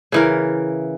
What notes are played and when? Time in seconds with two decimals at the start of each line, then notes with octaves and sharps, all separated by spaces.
0.12 C#3 E3 A#4